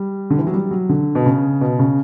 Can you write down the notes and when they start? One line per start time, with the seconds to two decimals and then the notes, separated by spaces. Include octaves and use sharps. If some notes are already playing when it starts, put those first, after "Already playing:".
Already playing: G3
0.30 D3
0.38 E3
0.47 F#3
0.54 G3
0.71 F#3
0.89 D3
1.15 B2
1.26 C#3
1.61 B2
1.79 C#3